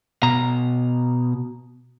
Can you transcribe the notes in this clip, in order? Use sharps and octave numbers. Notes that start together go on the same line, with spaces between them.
B2 A#5